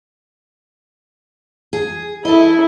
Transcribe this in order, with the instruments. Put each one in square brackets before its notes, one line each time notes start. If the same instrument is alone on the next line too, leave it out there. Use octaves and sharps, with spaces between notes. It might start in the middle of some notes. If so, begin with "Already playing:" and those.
[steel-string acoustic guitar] G#4
[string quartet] E4 [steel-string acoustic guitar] A4 D#5